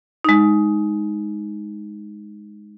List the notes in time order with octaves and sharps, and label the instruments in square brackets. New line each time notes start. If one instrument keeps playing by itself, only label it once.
[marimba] G#3 D#4